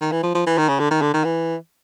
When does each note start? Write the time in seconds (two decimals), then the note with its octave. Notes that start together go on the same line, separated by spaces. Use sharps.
0.01 D#3
0.12 E3
0.23 F3
0.35 F3
0.46 E3
0.58 D#3
0.68 C#3
0.79 D3
0.91 D#3
1.01 D3
1.14 D#3
1.24 E3